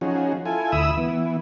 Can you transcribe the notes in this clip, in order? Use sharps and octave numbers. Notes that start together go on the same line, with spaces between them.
F3 C#4 D#4 F#4 G#4
E4 F4 A4 G#5
D2 E4 E5 B5 D#6 E6
E3 B3 E4